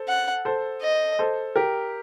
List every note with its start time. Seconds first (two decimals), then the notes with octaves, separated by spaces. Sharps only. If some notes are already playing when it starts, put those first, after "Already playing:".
Already playing: A4 C5
0.08 F#5
0.45 A4 C5
0.81 D#5
1.19 A4 C5
1.56 G4 A#4